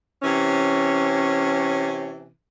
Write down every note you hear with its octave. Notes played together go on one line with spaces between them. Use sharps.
C3 E3 C#4